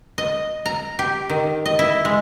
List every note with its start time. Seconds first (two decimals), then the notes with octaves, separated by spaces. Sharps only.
0.18 D#5
0.66 A#5
0.99 G4
1.30 D#3
1.66 D#5
1.79 E4
2.05 G#3